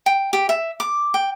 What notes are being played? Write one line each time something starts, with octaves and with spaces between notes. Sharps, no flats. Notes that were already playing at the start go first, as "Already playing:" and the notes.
G5
G4
E5
D6
G5